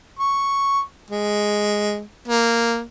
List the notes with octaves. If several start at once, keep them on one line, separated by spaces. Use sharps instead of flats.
C#6
G#3
A#3